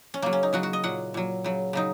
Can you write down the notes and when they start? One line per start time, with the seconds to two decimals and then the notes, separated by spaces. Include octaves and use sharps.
0.14 C#4
0.22 C#3 F#3 A#3
0.33 C#4
0.43 D#4
0.53 C#3 F#3 F#4
0.63 F#4
0.73 D#5
0.83 A#2 F#3 F#5
1.14 A#2 F#3
1.44 C#3 F#3
1.73 C#3 F#3 D#4